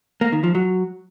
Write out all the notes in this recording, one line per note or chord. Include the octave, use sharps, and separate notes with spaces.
A#3
D#3
F3
F#3